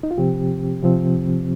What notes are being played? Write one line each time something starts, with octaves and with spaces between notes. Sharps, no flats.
D#4
F4
C3 F3 C4 G4
C3 F3 C4